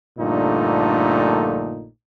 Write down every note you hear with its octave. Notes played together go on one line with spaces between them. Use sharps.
A#1 G2 A#2 D3 A3 D#4